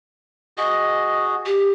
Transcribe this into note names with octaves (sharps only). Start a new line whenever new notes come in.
F#4 G#4 D#5
G4